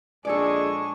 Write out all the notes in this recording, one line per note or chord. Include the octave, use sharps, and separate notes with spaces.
A#1 G#3 D4 A4 C#5 D5 G#5 C#6